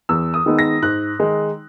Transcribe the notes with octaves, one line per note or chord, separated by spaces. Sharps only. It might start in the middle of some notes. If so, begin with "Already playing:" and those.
E2 E6
D#6
D#3 G#3 B3 D#4
A#6
G#2 F#6
D#3 G#3 D#4